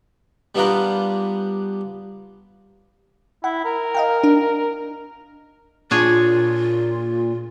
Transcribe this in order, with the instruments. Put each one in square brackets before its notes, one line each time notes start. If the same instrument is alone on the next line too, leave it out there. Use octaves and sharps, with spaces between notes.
[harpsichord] G3 B3 D4 F4 A#4 B4
[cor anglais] E4 [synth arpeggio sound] F#5
[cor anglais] A#4
[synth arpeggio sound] D#5 F5 G5
D4
[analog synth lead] A#2 [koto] D4 G#4 C#5 [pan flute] F4